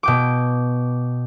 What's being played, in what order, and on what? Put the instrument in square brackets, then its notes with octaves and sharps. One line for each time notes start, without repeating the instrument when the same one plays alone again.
[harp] B2 G5 D6